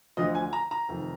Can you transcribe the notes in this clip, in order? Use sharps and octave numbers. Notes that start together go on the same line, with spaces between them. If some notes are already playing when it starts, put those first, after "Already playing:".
D2 D3 F3 D#5
G#5
A#5
A#5
F1 F2 D#3